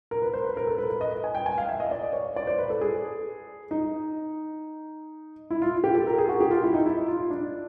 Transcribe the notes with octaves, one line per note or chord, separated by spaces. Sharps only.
A#4
B4
C5
B4
A#4
A4
B4
B4
D#5
G#5
G5
G#5
F5
E5
D#5
D5
C#5
D5
C5
B4
A4
G#4
D#4
E4
F4
G4
A4
A#4
G#4
F#4
G4
F4
E4
D#4
E4
F4
D4